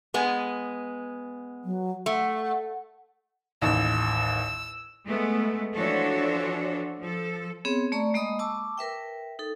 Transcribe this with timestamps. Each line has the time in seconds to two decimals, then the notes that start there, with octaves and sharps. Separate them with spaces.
0.14 G#3 B3 G#5
1.65 F#3
2.06 A3 F#5
3.62 A1 D#2 E6
5.06 G#3 A3 B3
5.74 E3 F3 D4 F#4 A4 C#5
6.99 F3 A4
7.65 B3 C4 G#4 C#5
7.92 A3 D5 A#5 C#6
8.14 G#3 A#3 D#5 B5 D#6
8.39 A5 C#6 D6 E6
8.78 A#4 B4 E5 G5
9.39 D#4 A4